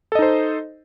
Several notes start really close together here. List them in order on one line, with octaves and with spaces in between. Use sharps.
A4 D#5 D#4 C5